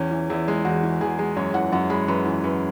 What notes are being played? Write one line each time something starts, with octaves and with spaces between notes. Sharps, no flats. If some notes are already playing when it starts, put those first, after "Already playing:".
Already playing: E2 C#4
E3
E2 E4
G#3
E2 F#4
E3
E2 G#4
G#3
F#2 C#5
E3 F#5
F#2 F#5
G#3 B5
F#2 B4
E3
F#2 B4